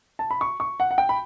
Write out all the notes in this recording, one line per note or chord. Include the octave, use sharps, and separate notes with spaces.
A5
B5
C#6
C#6
F#5
F#5
G5
B5